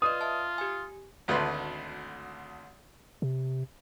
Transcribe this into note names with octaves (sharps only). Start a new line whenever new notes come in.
F4 B4 D5 D#5 D#6
E5 A5
G4 G#5
G#1 D2 A3 B4 C6
C3